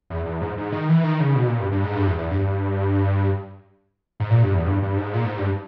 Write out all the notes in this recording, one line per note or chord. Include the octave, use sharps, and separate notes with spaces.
E2
E2
G#2
G#2
D#3
E3
D#3
C#3
B2
A#2
G2
G2
G#2
G2
E2
E2
G2
G#2
A#2
G2
E2
G2
G2
G#2
A#2
G#2
G2